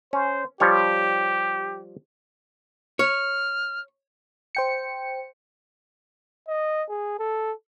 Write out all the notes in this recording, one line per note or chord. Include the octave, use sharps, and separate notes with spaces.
C#4 C5
F3 G3 G4 C#5
C#5 F6
C5 G5 C#7
D#5
G#4
A4